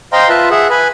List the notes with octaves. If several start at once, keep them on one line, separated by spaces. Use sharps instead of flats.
C5 D#5 F5 G5 A#5 C6
F4 B4 E5 A5
G#4 E5 F#5
B4 G#5 B5